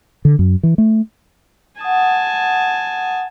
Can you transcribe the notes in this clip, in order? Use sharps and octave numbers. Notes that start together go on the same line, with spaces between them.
D3
F#2
E3
A3
F#5 G#5 A5 D#6